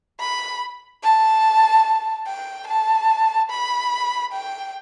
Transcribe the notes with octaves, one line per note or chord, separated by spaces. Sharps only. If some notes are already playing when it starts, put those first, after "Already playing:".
B5
A5
G5
A5
B5
G5